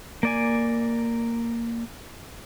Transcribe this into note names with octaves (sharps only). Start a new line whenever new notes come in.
A#3 D5 G#5